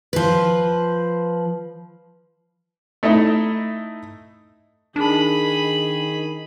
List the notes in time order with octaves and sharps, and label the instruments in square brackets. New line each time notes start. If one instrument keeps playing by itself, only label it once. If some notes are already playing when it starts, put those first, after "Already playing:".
[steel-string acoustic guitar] F3 B4
[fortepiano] A3 D#4 E4 D#5
[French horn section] D#3 [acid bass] D4 [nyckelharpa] G#4 B5